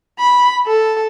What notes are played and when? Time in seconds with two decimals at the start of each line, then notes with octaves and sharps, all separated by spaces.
0.19 B5
0.66 A4